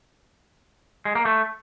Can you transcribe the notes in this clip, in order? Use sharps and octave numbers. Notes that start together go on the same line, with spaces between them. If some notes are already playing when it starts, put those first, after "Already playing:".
G#3
A#3
A3